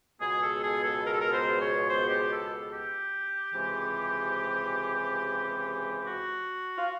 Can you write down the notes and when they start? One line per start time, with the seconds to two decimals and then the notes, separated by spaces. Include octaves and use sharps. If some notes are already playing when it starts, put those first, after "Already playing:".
0.20 C#2 B2 G#3 B3 G#4
0.42 A4
0.63 G#4
0.83 A4
1.05 A#4
1.13 A4
1.20 A#4
1.32 C5
1.60 C#5
1.88 C5
2.08 G4
2.30 A4
2.71 G4
3.54 C#2 C3 E3 G#3
6.06 F#4
6.78 F4